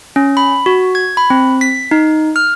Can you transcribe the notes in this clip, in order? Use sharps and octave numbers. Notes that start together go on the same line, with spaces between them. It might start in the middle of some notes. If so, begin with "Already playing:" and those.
C#4
B5
F#4
G#6
B5
C4
B6
D#4
F6